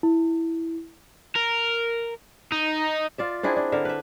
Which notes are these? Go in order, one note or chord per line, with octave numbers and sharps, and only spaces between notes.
E4
A#4
D#4
F4 D5 E5
C4 D4 E4 G#4
D4
D3 A#4 E5
B4 E5